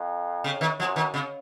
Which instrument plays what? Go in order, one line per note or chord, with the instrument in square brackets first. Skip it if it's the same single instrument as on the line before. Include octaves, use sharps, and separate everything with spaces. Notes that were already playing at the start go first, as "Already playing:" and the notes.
Already playing: [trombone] F2
[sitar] C#3
D#3
[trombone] F#2 [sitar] F3
[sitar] D#3
C#3